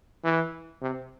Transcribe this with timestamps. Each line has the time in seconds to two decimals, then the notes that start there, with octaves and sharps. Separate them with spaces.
0.24 E3
0.82 C3